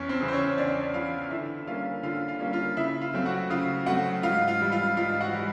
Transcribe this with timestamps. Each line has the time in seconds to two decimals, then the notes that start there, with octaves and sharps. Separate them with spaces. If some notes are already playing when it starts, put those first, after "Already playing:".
Already playing: E2 C#4 C#5
0.09 C4 C5
0.21 C#3 E3
0.28 C5
0.33 C#4 C#5
0.58 E2 D4 D5
0.94 C#3 E3 F4 F5
1.30 D3 E4 E5
1.67 G3 A#3 C#4 F4 F5
2.03 D3 F4 F5
2.28 F4 F5
2.40 G3 A#3 C#4
2.53 F4 F5
2.77 C#3 E4 E5
3.01 F4 F5
3.13 F#3 A3 C4
3.26 F#4 F#5
3.50 C#3 F4 F5
3.86 F#3 A3 C4 F#4 F#5
4.23 G#2 F4 F5
4.47 F4 F5
4.60 E3 G3
4.72 F4 F5
4.97 G#2 F4 F5
5.21 F#4 F#5
5.33 E3 G3